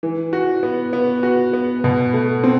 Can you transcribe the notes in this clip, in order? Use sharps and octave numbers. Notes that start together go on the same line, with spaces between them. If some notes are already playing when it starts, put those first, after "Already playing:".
E3
F#4
B3
B3
F#4
B3
B2
A3
C4